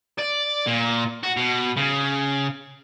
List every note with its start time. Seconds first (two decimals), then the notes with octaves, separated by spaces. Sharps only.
0.19 D5
0.67 A#2
1.23 F#4
1.37 B2
1.77 C#3